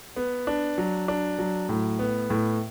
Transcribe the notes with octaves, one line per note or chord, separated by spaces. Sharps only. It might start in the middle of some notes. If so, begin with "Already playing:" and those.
B3
D4
F#3
D4
F#3
A2
B3
A2